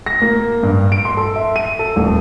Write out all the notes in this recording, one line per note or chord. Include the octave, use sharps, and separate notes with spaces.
A#6
A#3
G2
D7
C6
A4
E5
D#7
A4
D#1